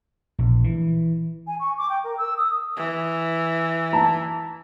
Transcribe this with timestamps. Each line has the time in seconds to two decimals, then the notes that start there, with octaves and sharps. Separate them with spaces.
0.38 A#1
0.64 E3
1.47 G#5
1.59 C#6
1.78 D6
1.89 G5
2.04 A#4
2.18 E6
2.37 D#6
2.77 E3
3.93 A5 A#5